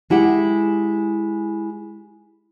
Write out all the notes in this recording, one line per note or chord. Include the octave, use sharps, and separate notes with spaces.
G#3 E4 G4 F#5